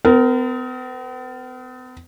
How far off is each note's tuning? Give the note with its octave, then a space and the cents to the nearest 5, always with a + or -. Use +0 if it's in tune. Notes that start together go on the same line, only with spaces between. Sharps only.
B3 +45 A#4 -10